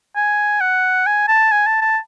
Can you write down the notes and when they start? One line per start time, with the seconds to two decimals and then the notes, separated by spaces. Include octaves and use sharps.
0.16 G#5
0.61 F#5
1.07 G#5
1.28 A5
1.52 G#5
1.67 A5
1.82 A5